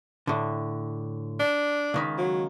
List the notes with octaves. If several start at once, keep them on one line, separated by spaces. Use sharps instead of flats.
A2 D3
D4
C#2 D#3 B5
F#3